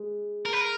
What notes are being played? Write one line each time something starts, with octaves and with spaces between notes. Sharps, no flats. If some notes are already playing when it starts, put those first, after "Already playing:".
Already playing: G#3
A#4
B4
A#4